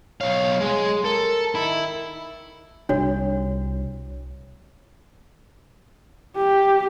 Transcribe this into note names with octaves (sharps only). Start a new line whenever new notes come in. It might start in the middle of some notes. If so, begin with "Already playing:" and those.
B1 C#5 F5
G#3 G#4
A4 A#4
D#3 E4
C2 D4 F#4 C#5
G4